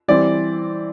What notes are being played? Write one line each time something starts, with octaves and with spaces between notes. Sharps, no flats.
E3 G3 C4 D5